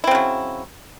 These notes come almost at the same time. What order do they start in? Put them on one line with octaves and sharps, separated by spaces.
E4 C4 C#3 F#3